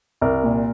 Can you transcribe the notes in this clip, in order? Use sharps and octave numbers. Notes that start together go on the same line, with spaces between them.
C2 A#4
A#2